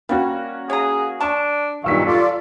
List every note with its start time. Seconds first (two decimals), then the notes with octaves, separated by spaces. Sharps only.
0.09 G3 A#3 C#4 F#4
0.70 G#4 C#5 A#5
1.20 D4 A5 C#6
1.84 G2 A#2 D#3 F#3 F5 E6 B6
2.07 F4 A4 D5